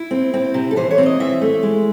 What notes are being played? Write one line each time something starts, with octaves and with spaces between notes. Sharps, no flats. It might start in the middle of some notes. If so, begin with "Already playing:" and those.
Already playing: E4
C4
C4
C3
A4
E3 C5
C#5
C4
D#5
E3 E5
A3
G#3